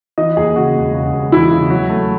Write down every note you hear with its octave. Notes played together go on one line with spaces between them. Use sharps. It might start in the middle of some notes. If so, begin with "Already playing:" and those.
E3 D#5
D#2 G#4
C#3 F#4
E1
C#3
E1
E3 E4
C#3
F#3
A3